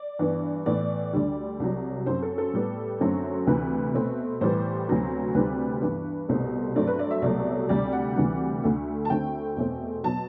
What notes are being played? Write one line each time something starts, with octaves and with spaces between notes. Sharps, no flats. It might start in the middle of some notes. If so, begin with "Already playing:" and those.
Already playing: D5
G2 E3 B3
A2 E3 B3 D5
D2 D3 G3
C2 C3 F#3
F#2 F#3 C4 C5
A4
A4
A2 G3 B3
F#2 D3 F#3 A3 C4
D2 C3 E3 B4
B2 A3 C4
A2 E3 G3 B3 C5
D2 C3 F#3 B3
D2 C3 G3 C4 B4
G2 E3 B3
C2 B2 A3 C4
G2 F#3 A3 C4 D5
B4
D5
E5
C2 B2 F#3 A3 D5
D2 C3 G3 D5
F#5
D2 C3 E3 G3
D2 D3 A3
A5
D2 D3 A3 C4 G5
E2 B2 A3 C4
B2 F#3 A5